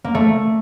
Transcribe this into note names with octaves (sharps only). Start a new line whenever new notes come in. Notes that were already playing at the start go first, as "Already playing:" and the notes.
A#3
A3